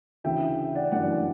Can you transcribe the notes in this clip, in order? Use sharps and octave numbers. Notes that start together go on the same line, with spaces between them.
D2 C#3 E3 E5 G5
D5 F#5
G1 F#2 E3 D5 F#5